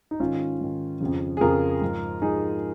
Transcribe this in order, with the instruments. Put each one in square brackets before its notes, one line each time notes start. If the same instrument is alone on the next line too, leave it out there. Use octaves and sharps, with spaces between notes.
[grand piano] D#4
G#2 D#3 C#4 F4
G#2 D#3
F2 C#3 F3
G#4
F2 C#3 F3 F4 A#4
G#2 F3
G#2 F3 D#4 G#4